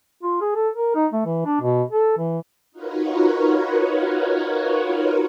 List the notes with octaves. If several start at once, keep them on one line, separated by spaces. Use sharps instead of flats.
F4
G#4
A4
A#4
D#4
A3
E3
D4
B2
A4
E3
D#4 F4 F#4 A#4 B4 C#5